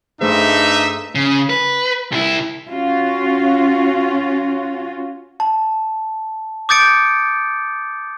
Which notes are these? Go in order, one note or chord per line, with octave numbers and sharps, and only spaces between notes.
G2 A3 D#4 G#4 C5 E5
C#3
B4
C2 E4
C#4 F4 F#4
A5
D6 D#6 G6 A6 C#7 D7